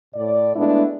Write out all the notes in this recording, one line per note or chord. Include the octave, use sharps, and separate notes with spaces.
A2 D5
G#3 A3 B3 D4 E4